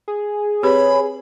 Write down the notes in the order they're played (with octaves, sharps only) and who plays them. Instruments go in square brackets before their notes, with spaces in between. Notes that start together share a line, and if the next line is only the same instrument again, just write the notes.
[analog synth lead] G#4
[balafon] C4 G4 B4 [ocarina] C#5 [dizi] B5